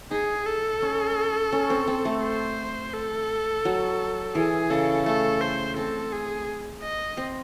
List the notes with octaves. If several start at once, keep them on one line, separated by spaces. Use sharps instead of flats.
D#4 G#4
A4
C#4
C#4
C4
C4
A3
C5
A4
F#3
E3 G#4
C#3 A4
A3 A4
C5
C4 A4
G#4
D#5
C4